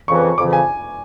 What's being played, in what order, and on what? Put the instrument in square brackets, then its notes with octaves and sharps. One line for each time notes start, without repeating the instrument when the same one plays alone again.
[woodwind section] F2 C#3 E3 [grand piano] C#6
[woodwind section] F2 [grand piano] D6
[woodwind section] C#3 E3
[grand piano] G#5